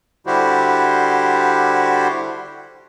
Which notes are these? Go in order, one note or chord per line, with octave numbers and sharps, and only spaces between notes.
D3 G3 E4 F#4 G4 C5